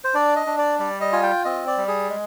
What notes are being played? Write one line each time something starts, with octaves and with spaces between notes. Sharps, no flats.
C5
D4 D5
D#5
D4
D5
G3 D5
D#5
F4 G#5
G5
C4 D#5
D5
G3
G#4
G#3